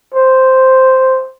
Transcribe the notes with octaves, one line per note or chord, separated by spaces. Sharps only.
C5